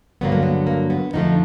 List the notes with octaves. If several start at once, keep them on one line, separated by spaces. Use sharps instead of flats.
G2 D3 F#3 A#3 B3
A#3
B3
A#3
B3
F2 D3 F3 A3 D#4